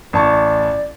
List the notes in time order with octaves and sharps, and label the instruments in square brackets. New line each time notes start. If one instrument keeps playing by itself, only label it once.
[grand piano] A1 A5 C#6 [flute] D5